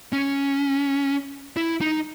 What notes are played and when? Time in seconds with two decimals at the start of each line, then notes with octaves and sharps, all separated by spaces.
0.13 C#4
1.57 E4
1.81 D#4